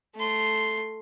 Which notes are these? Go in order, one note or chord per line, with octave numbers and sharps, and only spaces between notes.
A3 C6